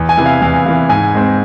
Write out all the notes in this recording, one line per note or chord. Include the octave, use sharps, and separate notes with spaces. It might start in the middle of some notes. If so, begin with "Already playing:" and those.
Already playing: E2
G#5
C3 E3
F5
E2 F5
C3 E3 F5
G#2 G#5
G#3 C4